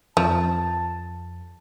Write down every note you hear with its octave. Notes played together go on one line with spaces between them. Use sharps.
F2 F3 A5